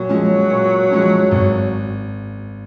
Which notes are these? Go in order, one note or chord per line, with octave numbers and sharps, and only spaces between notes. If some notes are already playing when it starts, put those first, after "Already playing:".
Already playing: A#2 F#3
F3 G#3 C#4
A#2
F3 G#3 C#4
G#1